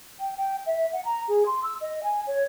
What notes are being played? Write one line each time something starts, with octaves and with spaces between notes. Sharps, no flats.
G5
G5
E5
F#5
A#5
G#4
C6
E6
D#5
G#5
C#5